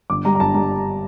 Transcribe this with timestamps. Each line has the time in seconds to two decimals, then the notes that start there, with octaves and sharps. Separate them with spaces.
0.10 G1 D6
0.25 G3 A#5
0.35 A#5
0.40 G1 A5
0.54 G3 A#5